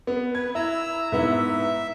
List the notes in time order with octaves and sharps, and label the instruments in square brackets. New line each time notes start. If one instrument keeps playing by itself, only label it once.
[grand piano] B3
[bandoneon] B4 [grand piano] G#6
[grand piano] E4 [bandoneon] A#5 E6
[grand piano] G#2 B3 E4 [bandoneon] E5